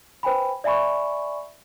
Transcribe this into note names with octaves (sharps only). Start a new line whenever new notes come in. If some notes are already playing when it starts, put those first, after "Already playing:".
B4 C5 G5 G#5 B5
D5 E5 G#5 B5 C#6